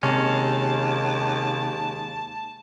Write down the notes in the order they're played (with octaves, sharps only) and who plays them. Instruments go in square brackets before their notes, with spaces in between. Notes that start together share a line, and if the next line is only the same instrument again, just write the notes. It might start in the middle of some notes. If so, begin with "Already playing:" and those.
[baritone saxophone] D#2 [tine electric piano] C3 [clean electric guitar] G#3 C#4 [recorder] A5